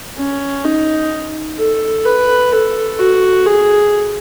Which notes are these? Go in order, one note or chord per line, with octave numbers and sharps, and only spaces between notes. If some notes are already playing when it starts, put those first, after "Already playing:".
C#4
D#4
A4
B4
A4
F#4
G#4